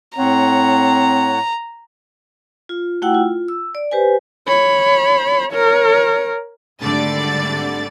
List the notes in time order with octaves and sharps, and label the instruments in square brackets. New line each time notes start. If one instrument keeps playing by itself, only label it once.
[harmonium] A2 C#5 F#5 [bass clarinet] C4 [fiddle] A#5
[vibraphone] F4
A3 E4 F#4 F#5 G5 E6
F4
E6
D5
G4 B4 C5 G#5
[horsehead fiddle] C#5 B5
A#4 C#5
[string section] G#1 D3 G3 A3 D5 A6